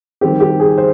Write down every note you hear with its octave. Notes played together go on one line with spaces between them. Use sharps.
D#3 G3 C4 G4
G4
G#4
C5